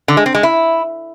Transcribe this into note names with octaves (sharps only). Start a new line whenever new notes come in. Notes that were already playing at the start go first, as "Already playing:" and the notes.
D3
G#3
C4
G#3
E4